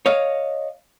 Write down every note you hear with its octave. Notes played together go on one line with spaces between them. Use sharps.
C#5 D#5 F5